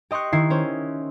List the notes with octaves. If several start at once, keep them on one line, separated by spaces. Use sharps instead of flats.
G4 D#5 C6 C#6 F#6
D#3 E4 C7
C#4 C5